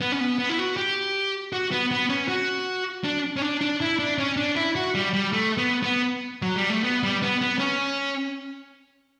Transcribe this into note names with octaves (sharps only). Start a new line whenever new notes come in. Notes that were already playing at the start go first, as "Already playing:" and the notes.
B3
C#4
B3
B3
E4
F#4
G4
F#4
B3
B3
C#4
F#4
D4
C#4
D4
D4
E4
D4
C#4
D4
E4
F#4
G3
G3
A3
B3
B3
F#3
G3
A3
B3
G3
B3
B3
C#4